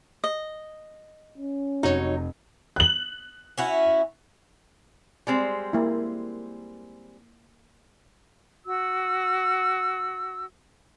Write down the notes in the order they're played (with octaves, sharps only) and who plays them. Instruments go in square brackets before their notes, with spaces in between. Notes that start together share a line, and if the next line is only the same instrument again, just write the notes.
[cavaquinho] D#5
[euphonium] C#4
[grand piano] F1 [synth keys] F#3 F#4 C#5 [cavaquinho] D#4
[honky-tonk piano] F#6 F#7
[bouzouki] C#4 E4 F#4
[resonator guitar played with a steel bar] G3 G#3 C4
[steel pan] A#3 E4
[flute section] F#4 E6